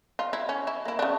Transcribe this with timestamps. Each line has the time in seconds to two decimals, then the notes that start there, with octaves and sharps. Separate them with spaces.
0.19 F4
0.33 E4
0.49 C#4
0.67 E4
0.85 A#3 E4
0.99 C#3 D4